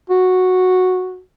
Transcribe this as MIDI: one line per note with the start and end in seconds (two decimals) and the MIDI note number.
0.10 1.20 66